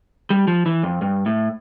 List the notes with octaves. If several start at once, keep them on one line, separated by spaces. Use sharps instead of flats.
G3
F3
E3
F2
G2
A2